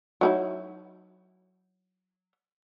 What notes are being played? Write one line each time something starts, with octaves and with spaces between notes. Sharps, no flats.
F#3 D#4 E4